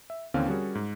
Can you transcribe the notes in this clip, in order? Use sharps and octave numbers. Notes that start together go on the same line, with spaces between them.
E5
D#2 D3 E3 C4 C#4 F5
G3 C#4 F#4 G#4 A#4
G#2